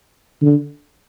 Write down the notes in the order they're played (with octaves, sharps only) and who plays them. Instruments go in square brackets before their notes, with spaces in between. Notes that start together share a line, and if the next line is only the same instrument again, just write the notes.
[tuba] D3